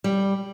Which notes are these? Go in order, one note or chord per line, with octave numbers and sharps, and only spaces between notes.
G3